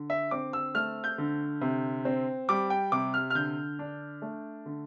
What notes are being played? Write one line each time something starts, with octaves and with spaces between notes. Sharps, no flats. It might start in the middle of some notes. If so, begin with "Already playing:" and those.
Already playing: D3
E5
C4 D6
E6
A3 F6
G6
D3
C3
C4
G3 D6
G5
C3 D6
F6
F6
D3 G6
D4
A3
D3